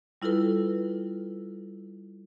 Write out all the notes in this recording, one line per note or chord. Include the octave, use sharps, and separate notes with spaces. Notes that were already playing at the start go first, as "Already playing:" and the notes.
G3 E4 F4 A4 B4